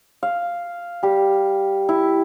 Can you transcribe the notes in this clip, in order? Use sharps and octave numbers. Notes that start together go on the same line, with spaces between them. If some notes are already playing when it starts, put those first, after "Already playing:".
F5
G3 G4
E4